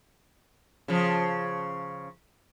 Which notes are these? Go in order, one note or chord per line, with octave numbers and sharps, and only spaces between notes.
C#3 F3